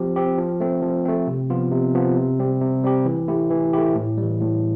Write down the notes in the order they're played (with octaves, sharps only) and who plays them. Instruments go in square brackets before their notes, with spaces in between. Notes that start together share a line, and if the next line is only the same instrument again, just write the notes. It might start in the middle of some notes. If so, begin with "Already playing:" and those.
Already playing: [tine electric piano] F3 C4 G4
C4 G4
F3
A3 C4
F3
A3 C4
C3
F3 B3 F4
C3
F3 B3 F4
C3
G3 C4 G4
C3
G3 C4 G4
E3
A3 E4 G4
E3
A3 E4 G4
A2
G3
E3
A2